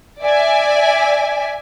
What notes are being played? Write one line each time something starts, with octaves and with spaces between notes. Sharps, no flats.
D5 E5 G#5